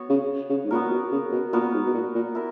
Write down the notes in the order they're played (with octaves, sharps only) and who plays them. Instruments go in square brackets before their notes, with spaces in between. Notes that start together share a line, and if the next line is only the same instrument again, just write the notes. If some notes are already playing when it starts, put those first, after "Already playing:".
Already playing: [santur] B3 F#4 C#5
[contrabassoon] C#3
C#3
G#2
[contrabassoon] A#2 [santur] B3 F#4 A#4
[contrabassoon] B2
C#3
B2
[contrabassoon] A#2 [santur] B3 F#4 A#4
[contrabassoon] G#2
B2
A#2
A#2
[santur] E4 A#4